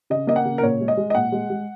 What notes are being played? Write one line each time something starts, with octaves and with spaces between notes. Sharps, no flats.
C#3 D#5
A#3 D#5
F#5
C#3
A#4
A#2 C#5
G#3
D#5
G#3
D#5
A#2 F#5
G#3
G#3